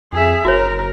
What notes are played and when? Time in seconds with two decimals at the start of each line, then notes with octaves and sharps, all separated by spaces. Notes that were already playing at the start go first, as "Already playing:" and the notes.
0.13 F2 G#4 E5
0.45 F#1 F#4 A#4 C#5